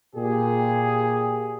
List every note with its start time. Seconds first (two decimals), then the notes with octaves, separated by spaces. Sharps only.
0.16 A#2 G4 G#4